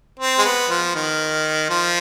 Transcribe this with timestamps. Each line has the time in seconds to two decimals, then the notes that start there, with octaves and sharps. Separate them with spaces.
0.19 C4
0.38 G#3
0.45 B3
0.69 F3
0.95 D#3
1.70 F3